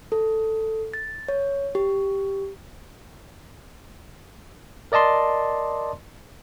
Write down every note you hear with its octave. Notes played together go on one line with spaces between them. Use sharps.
A4
A6
C#5
G4
A#4 D5 D#5 A5 C6